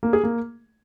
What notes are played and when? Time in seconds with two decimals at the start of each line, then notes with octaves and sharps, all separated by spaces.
0.03 A#3
0.13 G#4
0.23 A#3